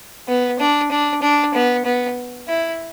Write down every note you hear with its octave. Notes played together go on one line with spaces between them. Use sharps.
B3
D4
D4
D4
B3
B3
E4